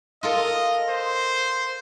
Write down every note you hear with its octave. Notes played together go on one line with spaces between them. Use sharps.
F4 A4 A#4 D#5
C5